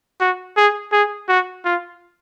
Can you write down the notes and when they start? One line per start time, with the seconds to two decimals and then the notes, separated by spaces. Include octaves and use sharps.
0.20 F#4
0.56 G#4
0.92 G#4
1.29 F#4
1.65 F4